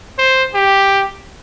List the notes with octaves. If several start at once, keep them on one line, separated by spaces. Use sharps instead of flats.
C5
G4